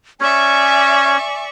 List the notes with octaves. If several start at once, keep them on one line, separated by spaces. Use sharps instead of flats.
C#4 C#5 D5 E5 G#5 C#6